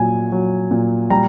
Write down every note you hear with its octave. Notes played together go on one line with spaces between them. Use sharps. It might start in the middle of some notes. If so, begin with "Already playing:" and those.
Already playing: A#2 F#3 G#5
F#3
A#2
G3 A#5